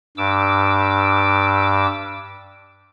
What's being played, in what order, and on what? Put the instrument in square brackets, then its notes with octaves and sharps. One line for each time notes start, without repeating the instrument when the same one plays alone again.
[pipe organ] G2 D6 E6